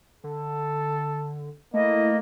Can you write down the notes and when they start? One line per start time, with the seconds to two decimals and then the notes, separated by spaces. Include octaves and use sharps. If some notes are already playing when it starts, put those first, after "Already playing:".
0.24 D3 A4
1.74 A3 A#3 E4 D#5